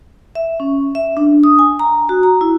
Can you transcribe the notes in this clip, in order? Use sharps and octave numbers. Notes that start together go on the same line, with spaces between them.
E5
C#4
E5
D4
D#6
G#5
A#5
F#4
A#5
E4